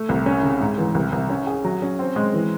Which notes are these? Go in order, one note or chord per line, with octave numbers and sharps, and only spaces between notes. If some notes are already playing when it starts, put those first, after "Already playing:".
Already playing: A3
C2
C#4
C#3
G#2
E3
C2
C2
C#4
G#4
F#3
C#4
C4
G#3
E3